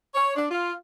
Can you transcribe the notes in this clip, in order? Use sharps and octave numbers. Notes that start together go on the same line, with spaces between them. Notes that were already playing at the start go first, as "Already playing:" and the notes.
C#5
D4
F4